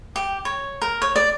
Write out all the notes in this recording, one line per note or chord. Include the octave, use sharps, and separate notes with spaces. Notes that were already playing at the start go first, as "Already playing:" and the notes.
G4
C#5
A#4
C#5
D5